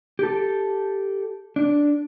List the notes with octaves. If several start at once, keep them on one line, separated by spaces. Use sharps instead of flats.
G4 A4
D4